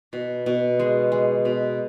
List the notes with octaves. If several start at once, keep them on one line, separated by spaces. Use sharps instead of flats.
B2
B2
G#3
G#3
B2